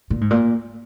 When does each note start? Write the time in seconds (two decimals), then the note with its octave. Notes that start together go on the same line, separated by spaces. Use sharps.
0.10 A#2
0.21 G#2
0.31 A#2